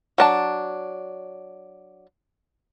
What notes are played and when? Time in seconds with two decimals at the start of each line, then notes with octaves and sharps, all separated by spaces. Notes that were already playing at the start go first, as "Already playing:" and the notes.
0.18 F#3 D4 A5